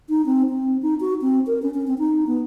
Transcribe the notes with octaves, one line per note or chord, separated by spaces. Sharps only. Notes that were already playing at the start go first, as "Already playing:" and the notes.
D#4
C4
C4
D#4
F#4
C4
A#4
C#4
C#4
C4
D#4
B3